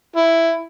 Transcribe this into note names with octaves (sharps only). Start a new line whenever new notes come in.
E4